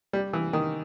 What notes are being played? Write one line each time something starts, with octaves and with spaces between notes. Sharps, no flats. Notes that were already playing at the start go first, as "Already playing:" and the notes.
G3
E3
D#3